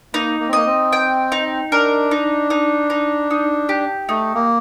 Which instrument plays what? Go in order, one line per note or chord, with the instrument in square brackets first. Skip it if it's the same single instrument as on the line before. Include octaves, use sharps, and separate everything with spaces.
[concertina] A#3 [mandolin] D#4
[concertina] A#3
C4
[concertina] A#3 [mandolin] D#5
[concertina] C4
[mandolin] G5
D#4
[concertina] D4 [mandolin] A#4
[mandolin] D#4
D#4
D#4
D#4
G4
[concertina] A3 [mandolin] D#4
[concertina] A#3